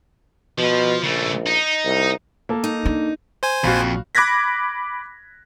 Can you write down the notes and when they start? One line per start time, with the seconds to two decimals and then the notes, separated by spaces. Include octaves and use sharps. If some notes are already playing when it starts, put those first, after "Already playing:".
0.58 B2 F3
1.03 A#1 C#3 A3
1.46 D#4
1.85 C2
2.49 A#3 A4
2.64 D#4
2.85 D4
3.43 C5 G#5
3.64 A#1 F2 A#2 F#4 F5 B5
4.15 B5 D6 F#6 G#6 A#6 B6